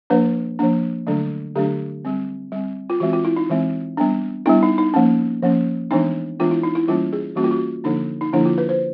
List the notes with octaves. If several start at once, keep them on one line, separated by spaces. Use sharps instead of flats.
F3 A#3 D4 B4
F3 A#3 D4
D3 F#3 A3 D4
D3 F#3 A3 D4 G4
G3 C4
G3 C4
F4
E3 G#3 C4 F#4
F4
E4
D#4
E3 G#3 C4
G3 B3 D4
G3 B3 D4 E4
D#4
D#4
F3 A#3 C#4
F3 A#3 C#4
E3 G#3 B3 D4 D#4
E3 G#3 B3 D4 F4
E4
D#4
E4
E3 G3 A#3 C#4 F4
G#4
E3 G3 A#3 C#4 F#4
F4
F#4
D3 F3 A#3 D4 D#4
D#4
D3 F3 A#3 D4 E4
F4
B4
C5